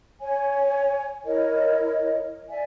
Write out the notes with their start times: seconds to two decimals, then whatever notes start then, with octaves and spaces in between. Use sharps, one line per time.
0.22 C#5 G#5
1.25 E4 A#4 C#5 D#5
2.49 D5 E5 G#5